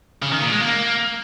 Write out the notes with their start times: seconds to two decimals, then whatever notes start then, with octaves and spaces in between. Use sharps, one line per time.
0.22 C#3
0.32 D#3
0.42 A#2
0.52 G#3
0.61 A#3